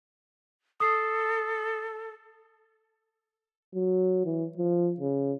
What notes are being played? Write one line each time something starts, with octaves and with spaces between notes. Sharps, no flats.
A4 D#6 C7
F#3
E3
F3
C#3